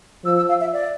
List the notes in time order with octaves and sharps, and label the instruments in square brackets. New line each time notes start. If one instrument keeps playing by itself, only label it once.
[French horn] F3 [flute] E6
[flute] E6
F5
E5
D5